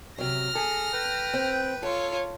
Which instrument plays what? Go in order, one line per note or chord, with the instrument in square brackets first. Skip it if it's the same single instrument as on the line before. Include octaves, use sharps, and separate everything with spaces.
[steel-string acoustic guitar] C3 F#3 [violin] F6 A#6
[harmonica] G#4 [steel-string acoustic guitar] A4
[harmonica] B4 G5
[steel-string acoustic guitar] C4
[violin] F4 C#5 [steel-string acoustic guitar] A4